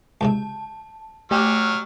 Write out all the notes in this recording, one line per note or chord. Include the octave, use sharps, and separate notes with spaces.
C#2 G#2 C3 A5
F#3 A3 G4 E6 F6